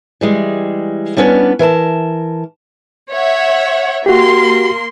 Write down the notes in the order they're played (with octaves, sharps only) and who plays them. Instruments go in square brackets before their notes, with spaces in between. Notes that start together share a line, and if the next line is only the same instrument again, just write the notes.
[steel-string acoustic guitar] E3 G3 G#3
G3 B3 C#4 D4 A4 B4
E3 A#4 G#5 A5
[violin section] C#5 E5 F#5
[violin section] A#3 C6 [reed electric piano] F#4 G4